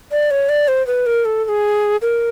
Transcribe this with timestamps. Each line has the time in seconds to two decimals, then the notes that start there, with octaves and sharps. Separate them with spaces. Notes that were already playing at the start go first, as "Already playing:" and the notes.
0.11 D5
0.31 C#5
0.49 D5
0.68 C5
0.87 B4
1.06 A#4
1.25 A4
1.45 A4
1.49 G#4
2.02 A#4